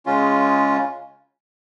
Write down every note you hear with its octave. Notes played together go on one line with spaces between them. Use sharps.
C#3 G#3 C#4 F4